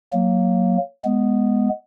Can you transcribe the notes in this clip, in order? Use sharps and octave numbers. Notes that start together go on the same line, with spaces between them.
F#3 A#3
G#3 B3